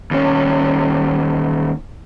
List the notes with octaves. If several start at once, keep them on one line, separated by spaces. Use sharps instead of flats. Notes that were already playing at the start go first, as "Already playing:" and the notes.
D#2 C#4